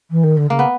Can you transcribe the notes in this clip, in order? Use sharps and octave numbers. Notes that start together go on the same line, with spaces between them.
E3
D#3
D3
C#3 A#3
B3